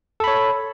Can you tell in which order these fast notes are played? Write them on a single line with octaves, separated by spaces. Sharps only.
A4 B5 C#5